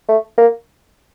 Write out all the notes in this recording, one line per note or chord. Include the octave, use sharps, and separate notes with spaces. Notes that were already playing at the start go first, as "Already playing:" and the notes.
A3
A#3